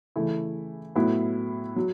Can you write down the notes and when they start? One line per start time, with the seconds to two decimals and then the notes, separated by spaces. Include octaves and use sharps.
0.16 C#3 E3 A3 E4
0.95 A2 F#3 B3 E4
1.76 F#3